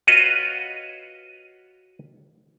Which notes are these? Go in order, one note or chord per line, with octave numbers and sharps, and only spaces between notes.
F4 F#4 B4 C#5 D#5